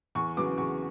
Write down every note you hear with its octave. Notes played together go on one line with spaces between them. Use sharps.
E2 C#6
C#3 F#3 B3 D6
E2 C#6